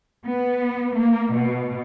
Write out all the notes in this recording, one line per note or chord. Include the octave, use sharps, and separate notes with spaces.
B3
A#3
B2